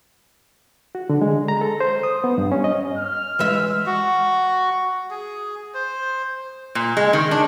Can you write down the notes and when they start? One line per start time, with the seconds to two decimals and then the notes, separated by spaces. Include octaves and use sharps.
0.95 F#4
1.10 D3
1.22 G#3
1.48 A#5
1.61 A4
1.80 C5
2.03 D#6
2.24 B3
2.38 G2
2.52 C#4
2.64 D#5
2.98 F6
3.39 E3 G#3 E5
3.86 F#4
5.11 G#4
5.74 C5
6.75 A#2
6.97 G#3
7.13 D#3
7.31 D4